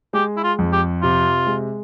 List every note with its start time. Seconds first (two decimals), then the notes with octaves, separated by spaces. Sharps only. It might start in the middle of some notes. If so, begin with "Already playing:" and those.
0.13 G#3 G4
0.37 E4
0.44 F4
0.59 F2
0.73 G4
1.02 C3 F4
1.47 G#3